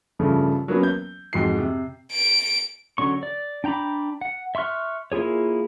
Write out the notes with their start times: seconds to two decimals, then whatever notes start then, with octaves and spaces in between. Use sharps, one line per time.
0.19 G2 C#3 F3 A3
0.68 F#3 A#3 B3 C#4
0.83 G6
1.33 F2 G#2 F#4 C7
1.59 C3
2.12 D7
2.98 D3 F#3 C#4 C#6
3.23 D5
3.64 D4 G5 A#5 B5 D6
4.21 F#5
4.55 E5 C6 C#6 F6 F#6
5.12 A#3 E4 F4 G#4 C#5